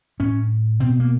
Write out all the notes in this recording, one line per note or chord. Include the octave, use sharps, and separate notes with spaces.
A2 C#4
B2 C4
A#3